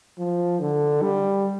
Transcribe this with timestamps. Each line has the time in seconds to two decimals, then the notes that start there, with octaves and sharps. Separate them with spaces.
0.18 F3
0.60 D3
1.02 G3